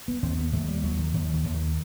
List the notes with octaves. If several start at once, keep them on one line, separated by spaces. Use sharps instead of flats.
B3
D#2 C4
B3
D#2 A3
G3
D#2 F#3
D#3
D#2 D#3
D#3
D#2
D#3